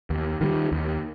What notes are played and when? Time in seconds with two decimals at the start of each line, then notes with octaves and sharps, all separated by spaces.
0.10 D#2
0.41 D#3 G3
0.72 D#2